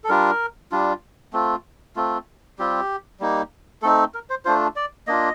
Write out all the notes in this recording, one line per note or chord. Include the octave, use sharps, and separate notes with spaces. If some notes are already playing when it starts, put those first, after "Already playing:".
A4
G3 D4 F4 A#4
G3 D4 F4
A3 C4 F4
A3 C4 F4
G3 C4 F4 G4
G3 A#3 D#4
A3 C4 D#4 A4
A#4
C5
A3 D4 F4 C5
D5
A#3 D4 F4 D#5